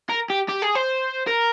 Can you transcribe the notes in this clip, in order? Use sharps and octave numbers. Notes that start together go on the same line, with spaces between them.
A#4
G4
G4
G#4
C5
A#4